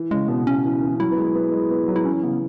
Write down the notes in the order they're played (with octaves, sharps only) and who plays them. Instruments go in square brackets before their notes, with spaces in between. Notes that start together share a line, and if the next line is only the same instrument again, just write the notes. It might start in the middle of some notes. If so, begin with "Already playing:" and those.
Already playing: [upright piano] E3
[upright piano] C#3 [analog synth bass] G#3
[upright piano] B2 [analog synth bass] B3
[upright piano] C#3 [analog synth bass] C#4
[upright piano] E3
E3
[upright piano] F#3 [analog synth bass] E4
[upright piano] B3
G#3
B3
G#3
B3
F#3
[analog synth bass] E4
[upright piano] E3 [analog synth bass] C#4
[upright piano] C#3 [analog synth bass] B3